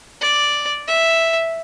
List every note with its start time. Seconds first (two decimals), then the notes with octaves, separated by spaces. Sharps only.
0.21 D5
0.88 E5